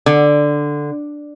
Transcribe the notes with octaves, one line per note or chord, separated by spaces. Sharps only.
D3